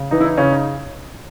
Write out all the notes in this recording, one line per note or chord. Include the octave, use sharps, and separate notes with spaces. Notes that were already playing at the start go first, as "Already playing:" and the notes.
Already playing: C#3
E3 D#4
E4
D#4
C#3 C#4
D#4